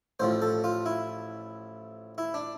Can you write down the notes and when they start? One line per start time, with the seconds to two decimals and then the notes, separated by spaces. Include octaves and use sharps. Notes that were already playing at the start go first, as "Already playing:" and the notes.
0.20 A1 A2 F3 C5
0.42 A4
0.64 F4
0.86 E4
2.18 E4
2.34 D4